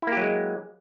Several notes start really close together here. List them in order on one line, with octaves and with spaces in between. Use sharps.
E4 A#3 G4 F#3 G#3